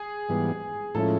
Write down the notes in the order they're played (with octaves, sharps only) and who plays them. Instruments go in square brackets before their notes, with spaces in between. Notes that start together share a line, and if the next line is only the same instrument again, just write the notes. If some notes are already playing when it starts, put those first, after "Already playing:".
Already playing: [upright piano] G#4
[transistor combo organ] G#2 E3 G3 B3
[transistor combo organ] A2 F3 G#3 C#4 E4 [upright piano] A4